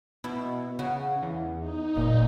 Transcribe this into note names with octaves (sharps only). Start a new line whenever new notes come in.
B2 E4
C#3 F#4
E2
D#4
F#1 A#2